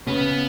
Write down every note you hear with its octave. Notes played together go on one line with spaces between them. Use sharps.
C#3 B3